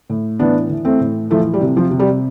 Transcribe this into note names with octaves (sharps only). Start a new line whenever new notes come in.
A2
E3 B3 D4
E3
A3 C4
A2
E3 F3 A3
G3
C3
F3
C3
G3